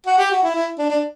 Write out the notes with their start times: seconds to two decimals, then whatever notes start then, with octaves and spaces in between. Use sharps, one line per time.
0.06 F#4
0.18 G4
0.31 F#4
0.43 E4
0.55 E4
0.78 D4
0.90 D4